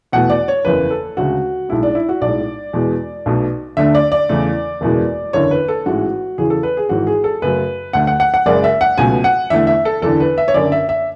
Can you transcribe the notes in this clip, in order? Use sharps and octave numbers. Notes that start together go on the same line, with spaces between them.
E2 B2 A3 F#5
D5
C#5
F#1 E2 C#3 B4
A4
D2 C#3 G#3 F#4
B1 A2 G#3 E4
D4
E4
F#4
B1 A2 G#3 D5
E2 B2 G#3
B1 B2 A3
D2 D3 A3 E5
D5
D5
E2 C#3 E3 A3
F#1 E2 B2 G#3
F#1 E2 D3 C#5
B4
A4
A1 G#2 E3 G#3 F#4
E2 C#3 E3 G#4
A4
B4
G#4
G#1 G#2 E3 F#4
G#4
A4
F#2 C#3 F#3 A3 B4
D2 D3 A3 F#5
F#5
F#5
F#5
F#1 F#2 C#3 G#3 D5
E5
F#5
C#2 B2 F#3 A3 G#5
F#5
E2 D3 A3 E5
E5
A4
F#1 E2 D3 A4
B4
E5
C#5
F#1 F#2 D3 D5
E5
E5